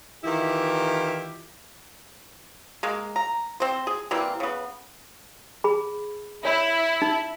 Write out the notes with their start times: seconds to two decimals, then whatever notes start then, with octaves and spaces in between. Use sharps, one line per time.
0.24 D#3 E3 E4 F4 G4
2.83 G#3 A#3
3.16 A#5
3.60 C4 C5
3.87 G#4
4.11 E3 G3 A#3 C4
4.40 C#3 B3
5.64 G#4 B5
6.45 E4 C#5
7.02 D#4